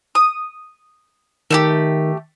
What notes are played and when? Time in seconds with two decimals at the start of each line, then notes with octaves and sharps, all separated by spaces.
0.15 D#6
1.51 D#3 A3 E4 G4